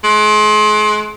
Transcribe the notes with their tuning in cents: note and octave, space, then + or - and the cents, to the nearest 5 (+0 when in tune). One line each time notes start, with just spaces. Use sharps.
G#3 +40